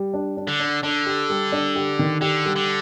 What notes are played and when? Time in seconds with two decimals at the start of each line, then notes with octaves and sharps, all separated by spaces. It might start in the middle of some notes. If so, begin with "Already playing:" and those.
Already playing: G3
0.14 D4
0.37 D4
0.48 D3
0.60 D4
0.83 D3 D4
1.06 G4
1.30 G3
1.52 D4
1.76 G4
1.99 D#3
2.21 D3 G4
2.45 G3
2.56 D3